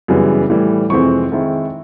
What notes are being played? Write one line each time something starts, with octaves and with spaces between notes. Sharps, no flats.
F#2 C#3 E3 G3 B3
A2 E3 G3
F2 C3 E3 G#3 C4 C#6
D#3 G#3 C4 E4